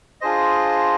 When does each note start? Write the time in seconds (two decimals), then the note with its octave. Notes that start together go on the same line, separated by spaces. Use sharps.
0.21 D4 F4 G#4 C5 D#5